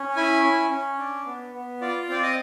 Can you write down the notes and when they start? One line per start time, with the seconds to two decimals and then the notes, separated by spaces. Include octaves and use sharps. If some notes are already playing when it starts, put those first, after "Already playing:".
Already playing: C#4
0.16 E4 G#5
0.44 C#4
0.71 C#4
0.99 D4
1.26 B3
1.54 B3
1.81 F4 D5
2.09 C4 D5
2.23 D#5